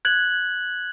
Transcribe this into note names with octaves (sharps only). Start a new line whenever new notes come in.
F#6 G#6 F#7